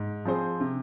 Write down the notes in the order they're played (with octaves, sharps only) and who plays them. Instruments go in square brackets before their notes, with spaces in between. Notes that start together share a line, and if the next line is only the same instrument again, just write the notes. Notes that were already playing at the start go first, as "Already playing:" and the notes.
Already playing: [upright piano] G#2
F3 C4 G#4 C5
C3